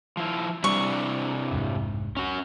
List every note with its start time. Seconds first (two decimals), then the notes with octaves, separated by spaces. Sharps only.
0.17 F3 E4
0.64 C3 G3 D4 E4 C#6
1.52 F1 C2 G#2
2.17 C#4 F#4